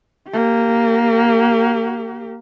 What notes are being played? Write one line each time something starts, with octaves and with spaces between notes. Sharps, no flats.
A#3 G4